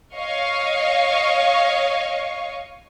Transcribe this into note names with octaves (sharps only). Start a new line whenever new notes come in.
C#5 D#5 F5 C#6